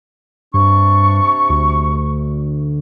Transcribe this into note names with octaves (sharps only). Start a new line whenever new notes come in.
G2 C3 D4 C#6
D2